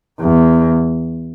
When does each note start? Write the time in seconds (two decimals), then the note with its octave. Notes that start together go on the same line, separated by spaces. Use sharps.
0.20 E2